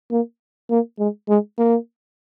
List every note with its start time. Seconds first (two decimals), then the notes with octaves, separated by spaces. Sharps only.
0.11 A#3
0.70 A#3
0.99 G#3
1.29 G#3
1.58 A#3